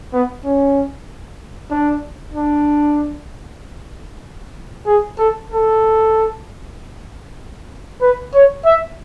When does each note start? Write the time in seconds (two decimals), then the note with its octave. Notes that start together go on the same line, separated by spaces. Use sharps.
0.13 B3
0.44 C#4
1.71 D4
2.33 D4
4.86 G#4
5.18 A4
5.50 A4
8.02 B4
8.34 C#5
8.65 E5